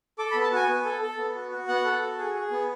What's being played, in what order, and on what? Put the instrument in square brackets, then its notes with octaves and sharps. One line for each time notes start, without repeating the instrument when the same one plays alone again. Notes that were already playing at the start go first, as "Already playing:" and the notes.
[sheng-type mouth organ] A4 D6
B5
B3
A5
F#4 G#5
B3
A4
A4
B3
F#4
F#4
B3 F#5
A4
F#4
G#4
G#4
B3